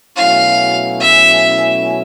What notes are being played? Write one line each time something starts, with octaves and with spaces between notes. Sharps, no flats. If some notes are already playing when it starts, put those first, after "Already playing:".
B2 F#3 A3 C#4 E4 F5
E5